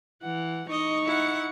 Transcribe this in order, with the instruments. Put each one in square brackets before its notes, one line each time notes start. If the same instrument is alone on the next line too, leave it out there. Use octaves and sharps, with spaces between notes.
[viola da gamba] E3 [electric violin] F#5
[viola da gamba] D#4 [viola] D#5 [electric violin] C#6
[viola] E4 F#5